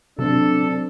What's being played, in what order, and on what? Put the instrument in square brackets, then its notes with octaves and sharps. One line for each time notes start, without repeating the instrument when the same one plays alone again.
[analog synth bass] C3 [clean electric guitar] F#3 C4 [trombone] D4 [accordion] A4